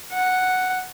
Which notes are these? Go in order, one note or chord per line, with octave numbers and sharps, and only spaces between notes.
F#5